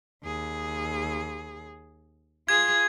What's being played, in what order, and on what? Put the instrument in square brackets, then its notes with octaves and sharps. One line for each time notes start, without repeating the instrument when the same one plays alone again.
[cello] D#2 G#4
[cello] F4 G#4 [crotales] G#6